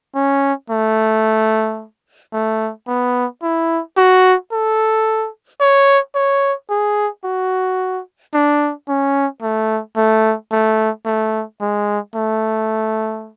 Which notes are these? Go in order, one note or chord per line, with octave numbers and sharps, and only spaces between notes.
C#4
A3
A3
B3
E4
F#4
A4
C#5
C#5
G#4
F#4
D4
C#4
A3
A3
A3
A3
G#3
A3